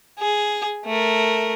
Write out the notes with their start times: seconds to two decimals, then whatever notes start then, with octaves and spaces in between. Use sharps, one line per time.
0.19 G#4
0.85 A3 A#4